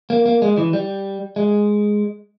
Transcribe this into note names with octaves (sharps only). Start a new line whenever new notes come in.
A#3
A#3
G#3
E3
G3
G#3